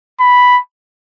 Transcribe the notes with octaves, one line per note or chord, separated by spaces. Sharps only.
B5